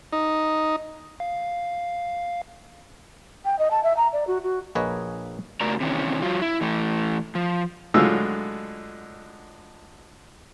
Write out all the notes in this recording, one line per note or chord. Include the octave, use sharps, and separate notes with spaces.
D#4
F5
G5
D#5
A5
E5
A#5
D5
F#4
F#4
A#1 A#3 G#4 B4 C#5 D#5
C#3 A3 F#4 A#4 D5 A#5
C3 D#3 E3 C#4
F#3 F4
E4
E3 A3
F3
A2 D3 F#3 G#3 F4 E6